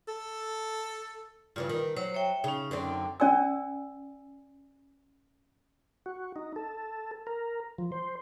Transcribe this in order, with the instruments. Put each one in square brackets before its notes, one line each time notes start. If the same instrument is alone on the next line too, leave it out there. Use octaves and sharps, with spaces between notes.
[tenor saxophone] A4
[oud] G2 C#3 E3 [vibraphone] F4
[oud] D#3 [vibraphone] B4
[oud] F#3 [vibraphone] C5
[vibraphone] C#5 E5 G5
[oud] C#3 [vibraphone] C#4 D#4
[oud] F#2 D3 C4
[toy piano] C#4 D5 G#5 E6
[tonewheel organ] F#4
D#4
A4
A#4
F3
C5